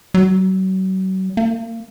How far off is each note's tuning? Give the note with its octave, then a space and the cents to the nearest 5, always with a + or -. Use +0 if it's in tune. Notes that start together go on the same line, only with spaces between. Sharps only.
F#3 +35
A#3 -30